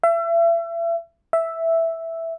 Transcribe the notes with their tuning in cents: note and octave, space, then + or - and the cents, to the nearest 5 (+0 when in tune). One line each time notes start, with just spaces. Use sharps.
E5 +35
E5 +0